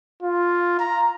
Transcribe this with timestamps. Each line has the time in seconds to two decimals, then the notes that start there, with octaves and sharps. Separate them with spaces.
0.22 F4
0.79 A#5